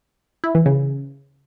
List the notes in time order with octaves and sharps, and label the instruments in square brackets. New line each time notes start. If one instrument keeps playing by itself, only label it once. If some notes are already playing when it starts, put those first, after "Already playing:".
[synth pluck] E4
E3
C#3